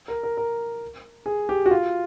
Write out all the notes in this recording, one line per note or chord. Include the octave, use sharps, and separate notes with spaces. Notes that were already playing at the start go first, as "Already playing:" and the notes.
A#4
A#4
A#4
G#4
G4
F#4
F4